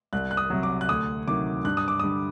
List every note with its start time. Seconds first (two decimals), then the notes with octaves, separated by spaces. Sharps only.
0.13 C2 F#6
0.31 F#6
0.37 D#6
0.50 C3 F#3
0.63 D6
0.81 F#6
0.89 D2 D#6
1.28 C3 D#3 F#3 D6
1.65 G2 F#6
1.77 D#6
1.88 D6
2.00 D3 G3 D#6